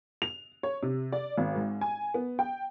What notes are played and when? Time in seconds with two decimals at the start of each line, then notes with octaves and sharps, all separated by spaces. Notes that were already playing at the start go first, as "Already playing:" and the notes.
0.22 F7
0.63 C#5
0.83 C3
1.12 D5
1.38 G#1
1.55 G#2
1.81 G#5
2.14 B3
2.39 G5